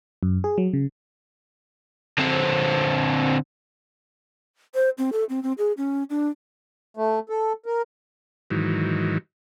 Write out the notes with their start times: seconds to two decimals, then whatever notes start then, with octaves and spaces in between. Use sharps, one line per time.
0.23 F#2
0.44 G#4
0.58 F#3
0.73 C#3
2.19 D3 C4
4.75 C5
4.98 C4
5.13 A4
5.29 C4
5.43 C4
5.58 G#4
5.77 C#4
6.10 D4
6.97 A3
7.29 A4
7.66 A#4
8.50 G#2 D#3 E3 F#3